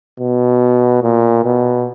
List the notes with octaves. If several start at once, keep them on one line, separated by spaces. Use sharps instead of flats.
B2
A#2
B2